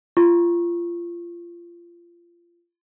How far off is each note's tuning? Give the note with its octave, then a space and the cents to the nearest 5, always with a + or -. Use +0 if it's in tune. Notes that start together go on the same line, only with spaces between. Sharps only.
F4 -25 C#6 -15